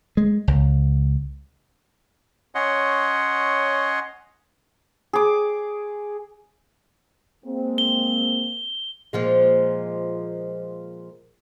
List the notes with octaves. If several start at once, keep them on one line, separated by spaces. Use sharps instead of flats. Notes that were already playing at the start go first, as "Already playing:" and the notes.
G#3
C#2
C#4 C#5 D#5 F#5 C6
G#4 D6
G#3 A#3 C4
G7
A#2 F3 G#3